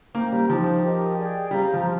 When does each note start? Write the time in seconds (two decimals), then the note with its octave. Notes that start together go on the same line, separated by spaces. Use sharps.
0.14 A#3 C5 G5 A#5
0.32 G3
0.49 F3 D#4 G4 C5
0.82 G4 A#4 D#5
1.17 G#4 D5 G5
1.51 G3 C5 F5 A#5
1.74 F3
1.85 F4